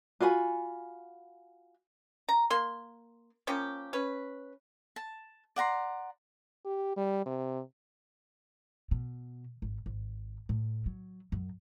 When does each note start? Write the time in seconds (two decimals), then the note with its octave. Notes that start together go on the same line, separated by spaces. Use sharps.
0.21 F4 F#4 G#5 B5
2.29 A#5
2.50 A#3 C6
3.47 F3 A#3 C#4 G4
3.93 C#4 B4
4.96 A5
5.56 D5 F#5 A#5 C6
6.65 G4
6.97 G3
7.26 C3
8.91 B2
9.62 G#1
9.86 G#1
10.49 A2
10.86 F#3
11.32 F#2